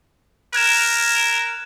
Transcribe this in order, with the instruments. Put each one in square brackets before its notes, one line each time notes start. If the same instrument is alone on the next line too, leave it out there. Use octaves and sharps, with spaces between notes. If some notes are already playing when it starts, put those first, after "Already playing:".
[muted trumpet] A#4 [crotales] F#6 G#6 E7